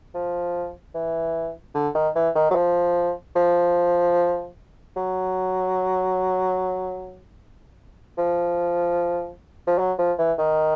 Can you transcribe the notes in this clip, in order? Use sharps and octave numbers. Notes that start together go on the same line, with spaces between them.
F3
E3
D3
D#3
E3
D#3
F#3
F3
F3
F#3
F3
F3
F#3
F3
E3
D#3